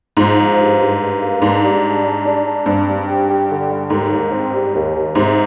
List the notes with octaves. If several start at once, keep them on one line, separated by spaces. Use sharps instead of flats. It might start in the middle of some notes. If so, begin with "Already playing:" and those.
G#2 F3
F3
G2
G2
G2
A#3
G#2 D4
G3
D4
D4
D4
D4
G2 C4
G3
G4
G4
D3
G3
D#2 G#2
D#2
C4
G3
D#2
D#2
G#2 C3